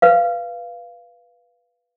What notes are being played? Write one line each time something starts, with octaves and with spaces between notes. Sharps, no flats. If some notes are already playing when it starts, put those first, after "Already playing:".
B4 F5